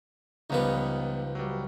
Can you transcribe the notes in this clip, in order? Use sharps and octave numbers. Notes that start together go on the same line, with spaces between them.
C#2 F3 G3 B3 D#4 B4
F#3 G3